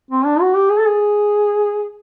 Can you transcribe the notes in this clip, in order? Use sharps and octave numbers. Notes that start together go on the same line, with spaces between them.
C4
D4
F#4
G4
G#4
A4
G#4